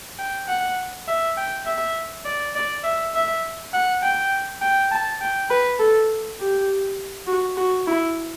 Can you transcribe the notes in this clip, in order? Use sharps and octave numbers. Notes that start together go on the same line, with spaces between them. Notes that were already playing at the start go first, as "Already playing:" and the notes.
G5
F#5
E5
G5
E5
D5
D5
E5
E5
F#5
G5
G5
A5
G5
B4
A4
G4
F#4
F#4
E4